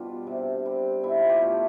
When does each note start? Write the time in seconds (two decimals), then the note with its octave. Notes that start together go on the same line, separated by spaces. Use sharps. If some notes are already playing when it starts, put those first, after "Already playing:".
Already playing: B2 G3 D4 F4
0.27 C3
0.66 G3 C4
1.03 B2 E4
1.18 F4
1.29 G4
1.42 A3 D4